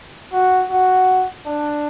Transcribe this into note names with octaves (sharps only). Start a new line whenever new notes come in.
F#4
F#4
D4